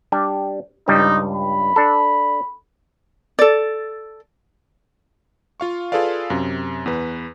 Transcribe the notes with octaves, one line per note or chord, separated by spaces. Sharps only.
G3 D4 G4
C#2 G2 G3 D#4
B5
D4 A4
A4 D5
F4 F5 C#6
F4 G#4 A4 B4 D5 F5
F#2 C3
E2 B4